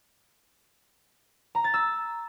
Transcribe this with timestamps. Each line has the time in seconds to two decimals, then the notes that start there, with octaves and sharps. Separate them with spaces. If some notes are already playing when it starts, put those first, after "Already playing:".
1.55 A#5
1.64 A6
1.74 E6